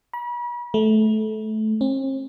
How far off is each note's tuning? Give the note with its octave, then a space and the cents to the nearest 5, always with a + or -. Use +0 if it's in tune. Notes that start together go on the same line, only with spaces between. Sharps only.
B5 -40
A3 -20
C4 +45